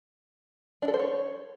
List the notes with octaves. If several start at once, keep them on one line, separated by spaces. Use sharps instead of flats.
D4
A4
C5
C#5